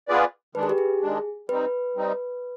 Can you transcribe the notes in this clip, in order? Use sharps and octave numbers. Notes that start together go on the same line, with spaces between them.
B3 F4 G#4 B4 D5
D#3 G#3 D4 B4
G#4
G4
G#4
D#3 G#3 D4
G3 C4 D#4 B4
G3 C4 D#4